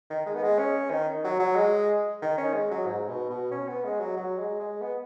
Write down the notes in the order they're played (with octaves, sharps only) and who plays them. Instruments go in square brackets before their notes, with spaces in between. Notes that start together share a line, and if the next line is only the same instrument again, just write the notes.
[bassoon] D#3
G#3
B3
G#3
C#4
D#3
F#3
F#3
G#3
D#3
C#4
G#3
F#3
G#2
B2
B2
C#4
B3
G#3
F#3
F#3
G#3
G#3
B3